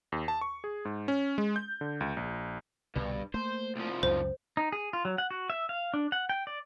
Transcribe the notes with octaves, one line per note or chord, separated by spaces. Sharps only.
D#2
A5
C#6
G#4
G#2
C#4
G#3
G6
D3
C#2
A#1
C2 G2 B2 D3
A3 A#3 C5
C2 F3
C#2 F#2 C#3 C5
D#4
G#4
F4
F#3
F#5
F#4
E5
F5
D4
F#5
G5
D5